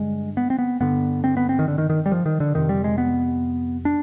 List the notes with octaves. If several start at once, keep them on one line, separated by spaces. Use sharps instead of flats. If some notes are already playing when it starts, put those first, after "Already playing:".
Already playing: G2 D3 G#3
B3
C4
B3
G2 D3 B3
C4
B3
C4
D#3
D3
D#3
D#3
G3
F3
D#3
D3
F2 C3 D#3
G3
G#3
B3
D4